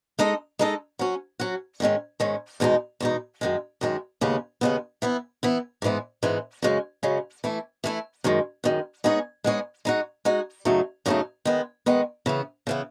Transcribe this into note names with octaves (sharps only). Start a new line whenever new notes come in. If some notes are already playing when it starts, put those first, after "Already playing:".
G#3 D#4 A4 D#5
G#3 D#4 A4 D#5
F#3 C#4 F#4
F#3 C#4 F#4
G#2 D#3 G#3 C#4
G#2 D#3 G#3 C#4
E2 B2 G#3 D#4
E2 B2 G#3 D#4
F#2 D#3 G#3
F#2 D#3 G#3
D#2 C#3 G#3 B3
D#2 C#3 G#3 B3
E3 B3 E4
E3 B3 E4
G#2 E3 G#3 B3
G#2 E3 G#3 B3
F#2 C#3 G#3 C#4
F#2 C#3 G#3 C#4
E3 A3 E4
E3 A3 E4
F#2 D#3 G#3
F#2 D#3 G#3
G#3 B3 D#4 G#4 C#5
G#3 B3 D#4 G#4 C#5
G#3 D#4 F#4
G#3 D#4 F#4
F#2 C#3 F#3 A3 D#4
F#2 C#3 F#3 A3 D#4
D#3 G#3 B3
D#3 G#3 B3
C#3 E3 B3
C#3 E3 B3